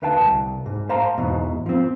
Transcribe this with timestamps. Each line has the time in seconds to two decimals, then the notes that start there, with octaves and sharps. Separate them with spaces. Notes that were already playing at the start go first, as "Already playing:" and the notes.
0.02 D2 B4 F5 G5 A5
0.21 C2
0.66 G#2
0.89 C5 F5 A5 A#5 C6
1.18 E2 G#2 B2
1.66 F3 C4